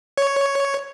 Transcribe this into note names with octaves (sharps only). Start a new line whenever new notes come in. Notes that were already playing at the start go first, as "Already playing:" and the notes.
C#5